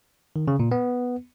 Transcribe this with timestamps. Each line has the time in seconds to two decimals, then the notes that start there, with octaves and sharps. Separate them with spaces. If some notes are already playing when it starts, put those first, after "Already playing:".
0.36 D#3
0.48 C#3
0.60 A#2
0.72 B3